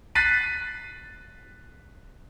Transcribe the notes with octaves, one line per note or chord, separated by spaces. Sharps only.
F#6 A6 B6 C7 D#7